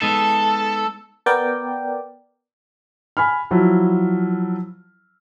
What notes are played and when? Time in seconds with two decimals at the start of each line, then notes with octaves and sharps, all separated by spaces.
0.02 G#3 B3 D#4 A4
1.26 B3 A#4 D5 G5
3.17 G#5 B5 F6
3.51 F3 F#3 E4